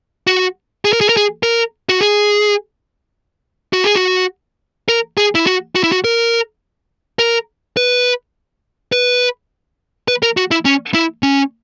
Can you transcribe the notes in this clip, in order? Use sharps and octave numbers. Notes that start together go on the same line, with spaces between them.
F#4
G#4
A#4
G#4
A#4
G#4
A#4
F#4
G#4
F#4
G#4
F#4
A#4
G#4
E4
F#4
F#4
E4
F#4
A#4
A#4
B4
B4
B4
A#4
F#4
E4
C#4
E4
C#4